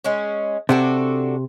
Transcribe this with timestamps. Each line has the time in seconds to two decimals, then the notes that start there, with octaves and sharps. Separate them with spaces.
0.04 G#3 C#4
0.69 C3 D4 F#4 A4